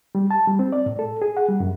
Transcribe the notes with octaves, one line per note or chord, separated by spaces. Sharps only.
G3
A5
G3
C4
D5
A2
A4
G#4
F#5
G3
F#2